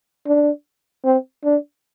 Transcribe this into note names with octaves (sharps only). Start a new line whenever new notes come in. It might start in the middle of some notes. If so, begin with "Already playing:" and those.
D4
C4
D4